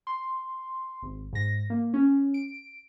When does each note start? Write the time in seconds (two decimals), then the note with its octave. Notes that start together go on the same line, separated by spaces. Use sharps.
0.07 C6
1.02 G#1
1.33 G#2 A#6
1.70 A#3
1.94 C#4
2.34 D7